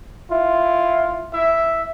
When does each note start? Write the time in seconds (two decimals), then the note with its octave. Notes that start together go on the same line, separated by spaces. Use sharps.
0.31 E4 F4
1.34 E4 E5